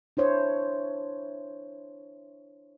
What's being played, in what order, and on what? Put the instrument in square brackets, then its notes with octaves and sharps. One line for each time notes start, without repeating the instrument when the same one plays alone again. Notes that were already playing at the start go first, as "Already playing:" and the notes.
[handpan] D4 E4 C5 C#5